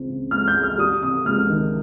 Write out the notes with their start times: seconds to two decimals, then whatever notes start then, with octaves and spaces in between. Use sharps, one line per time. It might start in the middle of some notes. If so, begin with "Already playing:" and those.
Already playing: C#2 G#3 C4
0.08 C#3
0.31 C#2 F6
0.48 G6
0.55 G#3
0.63 F6
0.78 G3 D#6
1.02 C3 D#6
1.25 C#2 F6
1.50 D#3